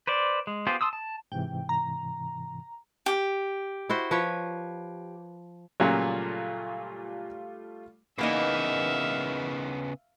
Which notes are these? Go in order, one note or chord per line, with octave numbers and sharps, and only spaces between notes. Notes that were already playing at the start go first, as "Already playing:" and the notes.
B4 C5 D5
G#3
B3 F4 G4 G#4 C5
A5 B5 C6 D#6 E6
A5
G#2 C3 E3 G5
A#5
G4
E4 F#4 C5
F3 B4 C#5
A#2 C#3 F#3 G3 A3 F4
C#3 E3 A#3 B3 D#4 E5 F5